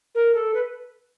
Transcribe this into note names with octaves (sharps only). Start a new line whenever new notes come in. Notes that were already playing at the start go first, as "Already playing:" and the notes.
A#4
A4
B4